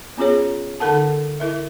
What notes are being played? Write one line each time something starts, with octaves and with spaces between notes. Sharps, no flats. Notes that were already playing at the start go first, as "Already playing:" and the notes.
B3 C#4 F4 G#4 C#5
D3 D#4 A4 A#4 F#5 A5
E4 A#4 E5